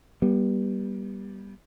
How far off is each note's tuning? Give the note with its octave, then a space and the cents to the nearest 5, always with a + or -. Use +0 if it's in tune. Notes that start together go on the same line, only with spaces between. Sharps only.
G3 +0 B3 -35